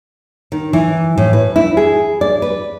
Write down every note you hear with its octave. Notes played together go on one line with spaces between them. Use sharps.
D#3
E3
A2
B4
E4
G#4
D5
B4